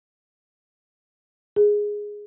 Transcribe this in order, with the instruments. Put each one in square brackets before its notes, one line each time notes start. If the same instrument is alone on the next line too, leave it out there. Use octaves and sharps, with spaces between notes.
[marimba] G#4